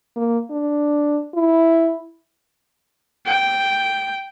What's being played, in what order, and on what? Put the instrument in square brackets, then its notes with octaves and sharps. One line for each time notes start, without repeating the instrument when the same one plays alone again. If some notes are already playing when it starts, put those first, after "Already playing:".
[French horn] A#3
D4
E4
[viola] G5